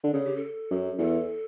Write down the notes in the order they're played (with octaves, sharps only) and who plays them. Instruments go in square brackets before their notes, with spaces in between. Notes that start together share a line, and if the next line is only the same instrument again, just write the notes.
[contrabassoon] D3
[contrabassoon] C#3 [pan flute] A4
[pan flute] G4
A4
[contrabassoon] F#2
[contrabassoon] E2 [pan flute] A4